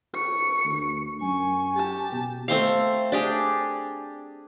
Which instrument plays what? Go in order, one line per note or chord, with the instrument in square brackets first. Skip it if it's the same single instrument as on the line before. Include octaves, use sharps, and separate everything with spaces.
[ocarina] C#6 [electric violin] C#7
[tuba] D2
[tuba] F#2 [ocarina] G#5 [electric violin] C#6
[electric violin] G4 A5
[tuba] B2
[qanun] A3 C4 C5 F5
D4 G4 G#4